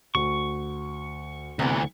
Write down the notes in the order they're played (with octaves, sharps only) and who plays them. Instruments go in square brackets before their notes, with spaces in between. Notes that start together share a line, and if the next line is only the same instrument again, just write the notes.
[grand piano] D2 [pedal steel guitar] C#6
[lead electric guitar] D2 E3 [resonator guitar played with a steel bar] C3 B3